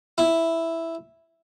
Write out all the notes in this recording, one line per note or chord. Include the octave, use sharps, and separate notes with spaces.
E4